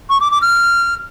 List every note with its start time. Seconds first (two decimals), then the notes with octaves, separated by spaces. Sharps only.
0.09 C#6
0.20 D6
0.31 D6
0.42 F6